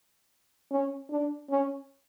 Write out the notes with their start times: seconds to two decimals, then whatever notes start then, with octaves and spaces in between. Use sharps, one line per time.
0.71 C#4
1.10 D4
1.50 C#4